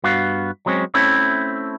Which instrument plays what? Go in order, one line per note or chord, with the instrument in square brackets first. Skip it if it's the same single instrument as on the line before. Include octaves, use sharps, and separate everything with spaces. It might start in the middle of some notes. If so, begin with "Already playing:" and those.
[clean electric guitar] G2 B3 F#4 F5
F#3 G#3 C4 C#4
A3 C4 C#4 E4